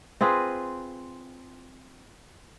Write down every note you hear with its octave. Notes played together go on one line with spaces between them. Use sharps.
C4 F4 G#4 B4